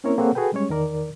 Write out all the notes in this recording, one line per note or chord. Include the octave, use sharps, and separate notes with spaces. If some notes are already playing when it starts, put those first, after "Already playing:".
A#3 C4 C#4 E4 A#4 C#5
A#3 C4 G#4 A4 C#5 F#5
F#4 G#4 A4 B4 G5
G3 G#3 C#4 C#5
E2 D#3 A#4 D5